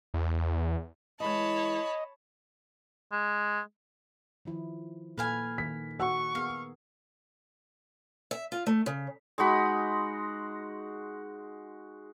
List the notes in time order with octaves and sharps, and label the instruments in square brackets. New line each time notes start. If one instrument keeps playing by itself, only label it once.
[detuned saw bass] E2
[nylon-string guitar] E3 G#3 [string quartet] C#5 A5 B5 [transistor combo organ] D#5
[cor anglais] G#3
[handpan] D#3 F3 E4
[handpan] A#2 A4 [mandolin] B4 F5 G#5
[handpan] D#3 [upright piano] B6
[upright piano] F#4 F#5 E6 [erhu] C#6
[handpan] B3 G#4 A#4 [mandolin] F5
[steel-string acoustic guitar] E5
F4
A3
C#3
[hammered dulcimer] G#3 D#4 F#4 B5